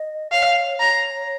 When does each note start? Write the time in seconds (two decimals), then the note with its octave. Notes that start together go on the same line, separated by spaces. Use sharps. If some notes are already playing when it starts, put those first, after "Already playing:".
Already playing: D#5
0.32 C#5 F5
0.79 C#5 A#5